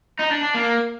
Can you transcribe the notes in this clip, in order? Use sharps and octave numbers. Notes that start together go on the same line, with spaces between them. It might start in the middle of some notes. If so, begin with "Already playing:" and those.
D#4
D4
D4
A#3